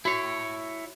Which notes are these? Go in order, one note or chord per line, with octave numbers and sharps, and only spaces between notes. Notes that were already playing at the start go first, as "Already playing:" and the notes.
E4 F#4 C#5